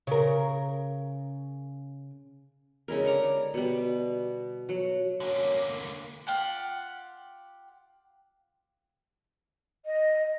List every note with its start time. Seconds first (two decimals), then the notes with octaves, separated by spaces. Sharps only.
0.07 C#3 A#4
2.88 C#3 G#3 E4 A#4
3.05 D3 F5 A#5 D6
3.54 B2 G3
4.69 F#3 F#4
5.20 D3 A#3 C#4
6.27 F4 G4 F#5
9.86 D#5